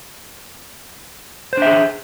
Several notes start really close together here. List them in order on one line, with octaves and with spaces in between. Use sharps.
C5 D4 E5 G#4